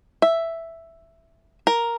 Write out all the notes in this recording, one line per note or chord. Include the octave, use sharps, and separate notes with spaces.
E5
A#4